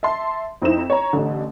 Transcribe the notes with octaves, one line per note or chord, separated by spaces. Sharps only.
E5 A5 C6
F2 C4 D#4 E4 E7
C#5 A#5
A1 D3